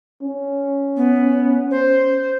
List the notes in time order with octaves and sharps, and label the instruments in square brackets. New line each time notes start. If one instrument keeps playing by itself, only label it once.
[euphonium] C#4
[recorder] B3
C5